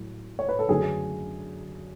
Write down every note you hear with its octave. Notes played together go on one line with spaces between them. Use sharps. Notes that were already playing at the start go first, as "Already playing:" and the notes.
Already playing: A2 F#3
C#5
B4
A4
F#2 D3 A3 D4 G#4